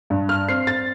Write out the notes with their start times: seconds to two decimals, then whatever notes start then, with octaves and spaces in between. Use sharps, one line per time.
0.10 G2
0.29 F6
0.49 C4 C7
0.67 A6